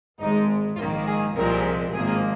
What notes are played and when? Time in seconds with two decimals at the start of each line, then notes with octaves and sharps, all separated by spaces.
0.20 G#1 G#2 G#3 D#4
0.77 A#1 G#2 D#3 A#3 F4
1.06 G#4
1.36 C2 A#2 F3 G#3 C4 A#4
1.93 G#1 G#2 F3 A#3 G#4